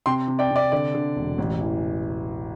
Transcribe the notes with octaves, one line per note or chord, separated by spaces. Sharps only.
C3 G5 C6
C3
D5 G5
C3 D5
D3 D5
D3
E1
A1
E3